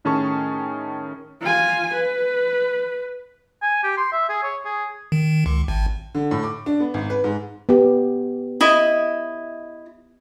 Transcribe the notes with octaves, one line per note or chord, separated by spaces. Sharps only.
A2 D#3 C#4 G#4 A5 C#6
F4 G#5
B4
G#5
G4
C6
E5
G#4
C#5
G#4
D#3
C#2
G#1
D3
A2
D6
D4
B3
G#1
B4
G#2
B3 G4
E4 D#5